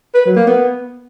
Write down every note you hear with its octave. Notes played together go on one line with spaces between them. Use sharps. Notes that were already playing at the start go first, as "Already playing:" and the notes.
B4
F#3
A#3
B3